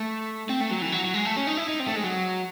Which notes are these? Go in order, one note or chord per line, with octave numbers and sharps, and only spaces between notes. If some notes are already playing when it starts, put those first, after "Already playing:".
Already playing: A3
C4
A3
F#3
E3
F#3
F#3
G#3
A3
C#4
D#4
E4
D#4
C4
A3
G#3
F#3